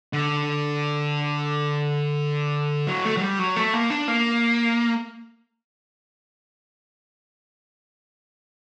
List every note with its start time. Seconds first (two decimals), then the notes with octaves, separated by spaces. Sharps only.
0.13 D3
2.87 F#3
3.05 A3
3.17 F#3
3.21 G3
3.39 F#3
3.56 A3
3.74 A#3
3.90 D4
4.08 A#3